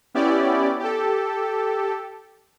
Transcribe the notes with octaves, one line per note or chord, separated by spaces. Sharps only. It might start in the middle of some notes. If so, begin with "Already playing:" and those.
B3 C#4 E4 G4 D5
G4 A4